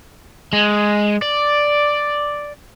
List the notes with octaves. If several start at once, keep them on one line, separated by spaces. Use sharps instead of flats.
G#3
D5